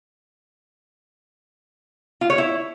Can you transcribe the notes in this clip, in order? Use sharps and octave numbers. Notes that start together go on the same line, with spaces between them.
F4
C#5
E4